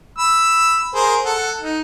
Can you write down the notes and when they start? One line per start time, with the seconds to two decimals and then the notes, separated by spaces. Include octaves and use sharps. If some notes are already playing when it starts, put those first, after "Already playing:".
0.18 B5 E6
0.95 G#4 A#4 C5
1.25 A4 F#5
1.61 D#4